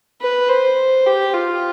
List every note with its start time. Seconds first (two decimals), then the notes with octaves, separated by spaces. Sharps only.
0.22 B4
0.49 C5
1.06 G4
1.34 F4